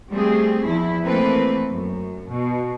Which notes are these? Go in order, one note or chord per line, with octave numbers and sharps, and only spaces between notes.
G3 A3 C4 G#4
E2 F3 E4
E3 A3 A#3 C4 A4 B4
F#2
B2